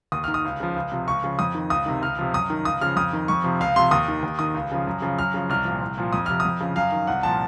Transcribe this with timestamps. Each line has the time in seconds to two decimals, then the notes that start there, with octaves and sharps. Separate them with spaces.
0.12 D#2 D#6
0.24 D#3 F6
0.34 D#6
0.45 C#2
0.60 C#3 F3
0.76 C#2
0.92 C3 F3
1.08 C#2 C#6
1.24 C#3 F3
1.39 F2 D#6
1.55 D#3
1.70 C#2 D#6
1.86 C3 D#3
2.02 C#2 F6
2.19 C3 F3
2.33 F#2 D#6
2.50 D#3
2.65 C#2 D#6
2.81 C#3 F3 F6
2.96 F2 D#6
3.13 D#3
3.28 F2 C#6
3.44 C3 F3
3.60 C#2 F5
3.76 C3 F3 C6
3.91 D#2 D#6
4.08 D#3
4.23 D#2
4.39 D#3 D#6
4.55 C#2
4.71 C#3 F3
4.87 F#2
5.02 C#3 F3
5.19 F#2 F6
5.34 C#3 F3
5.49 C2 F6
5.65 A#2 F3
5.82 C2
5.98 A#2 F3
6.13 F2 D#6
6.26 C3 F3 F6
6.40 D#6
6.45 F2
6.60 C#3 F3
6.76 F#2 F5
6.92 D#3
7.07 C2 F#5
7.23 A#2 F3 A5